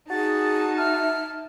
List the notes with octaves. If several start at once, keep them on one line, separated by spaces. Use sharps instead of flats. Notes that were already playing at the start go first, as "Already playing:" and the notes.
D#4 F#4 G#4 A5 A6
E5 F6